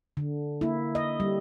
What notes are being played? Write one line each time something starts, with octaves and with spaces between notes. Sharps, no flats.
D3
A#3 E4
D#5
G3